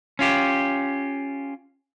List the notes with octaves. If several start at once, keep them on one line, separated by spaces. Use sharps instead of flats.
C#4 F4 G4